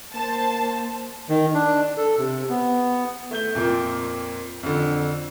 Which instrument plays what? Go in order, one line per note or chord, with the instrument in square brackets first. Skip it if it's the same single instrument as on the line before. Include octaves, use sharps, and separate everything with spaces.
[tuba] A#3 [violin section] C5 A5
[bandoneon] D#3
D4
A4
C3
B3
[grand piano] A3 G6 G7
F2 A#2 A#3 C4
F2 D3